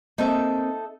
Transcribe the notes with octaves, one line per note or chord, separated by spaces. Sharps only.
A#3 C4 D#4 A4 E5